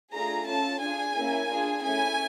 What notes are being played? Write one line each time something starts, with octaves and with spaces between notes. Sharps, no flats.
A3 D4 F4 G#4 A#5
C#4 F4 A4 A5
D4 F4 G#4 G#5
A#3 C#4 E4
D4 F4 G#4
A3 C#4 E4 G#5